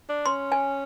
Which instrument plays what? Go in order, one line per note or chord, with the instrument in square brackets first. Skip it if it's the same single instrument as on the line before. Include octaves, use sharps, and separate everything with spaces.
[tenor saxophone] D4
[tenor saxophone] C#4 [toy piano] C6
[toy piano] G#5